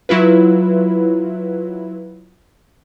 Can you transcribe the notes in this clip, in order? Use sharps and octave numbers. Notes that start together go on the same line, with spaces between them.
F#3 E4 F4 B4